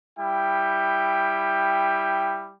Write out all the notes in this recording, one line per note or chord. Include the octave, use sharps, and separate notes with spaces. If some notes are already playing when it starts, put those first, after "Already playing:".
G3 E4 G5